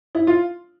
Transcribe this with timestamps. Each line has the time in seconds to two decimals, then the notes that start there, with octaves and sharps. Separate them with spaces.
0.15 E4
0.27 F4